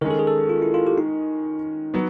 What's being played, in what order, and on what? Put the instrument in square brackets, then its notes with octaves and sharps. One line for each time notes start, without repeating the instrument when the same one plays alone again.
[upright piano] D#3 G#3 C#4 [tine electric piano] A#4
[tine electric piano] A4
G#4
A4
F4
E4
F4
G4
D#4
[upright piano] F#3 B3